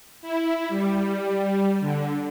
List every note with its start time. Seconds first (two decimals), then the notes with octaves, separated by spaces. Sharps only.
0.22 E4
0.69 G3
1.81 D3